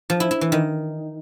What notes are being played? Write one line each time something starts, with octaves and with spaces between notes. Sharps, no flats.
F3
E4
E4
E3
D#3